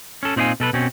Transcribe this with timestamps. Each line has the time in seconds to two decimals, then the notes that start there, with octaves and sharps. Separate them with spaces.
0.23 C#4 A4
0.36 A#2 C4 D#4 C5 F5 G#5
0.60 B2 A4 B4
0.73 B2 C4 C#4